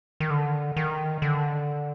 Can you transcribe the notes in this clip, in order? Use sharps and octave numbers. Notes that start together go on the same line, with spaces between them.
D#3
D3
D#3
D3